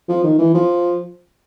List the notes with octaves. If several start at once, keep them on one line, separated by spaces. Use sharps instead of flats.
F3
D#3
E3
F3